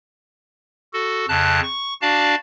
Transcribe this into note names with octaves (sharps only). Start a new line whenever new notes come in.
F#4 A4
F2 C#3 A5 F#6
C#6
D4 F#4 D5 F5 A5